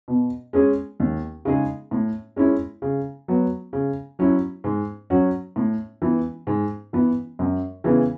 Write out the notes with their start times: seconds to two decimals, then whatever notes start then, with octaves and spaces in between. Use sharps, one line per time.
0.08 B2
0.53 G#3 C#4 G#4
1.00 D#2
1.45 C#3 G#3 D#4 G#4
1.91 A2
2.36 G#3 C#4 E4
2.82 C#3
3.28 F#3 B3
3.73 C#3
4.19 F#3 C#4 E4
4.64 G#2
5.10 F#3 C#4 F#4
5.56 A2
6.02 E3 B3
6.47 G#2
6.93 E3 B3
7.39 F#2
7.84 C#3 E3 B3